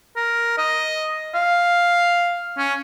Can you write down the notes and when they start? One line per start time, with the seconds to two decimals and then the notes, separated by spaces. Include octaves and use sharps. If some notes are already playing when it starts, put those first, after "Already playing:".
0.16 A#4
0.58 D#5
1.34 F5
2.58 C#4